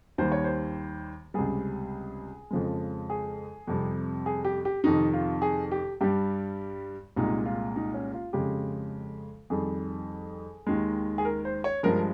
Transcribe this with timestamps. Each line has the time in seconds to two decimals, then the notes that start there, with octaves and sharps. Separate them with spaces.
0.18 D#2 D#3 G3 C5
0.32 C#5
0.44 C5
1.34 C#2 C3 G3 G#4
2.51 F2 C#3 F3 G#3
3.10 G#4
3.67 F2 C3 G3
4.26 G#4
4.45 G4
4.65 G4
4.84 F2 C3 D#3 D#4
5.13 F4
5.42 G#4
5.72 G4
6.01 G2 G3 G4
7.16 C2 A#2 G#3 D#4
7.46 F4
7.76 D#4
7.94 C#4
8.14 F4
8.33 F2 C#3 G#3 G4
9.50 F2 D#3 G3 G#4
10.67 D#2 D#3 G#3
11.18 G#4
11.25 A#4
11.45 C5
11.64 C#5
11.83 G2 F3 G#3 A#4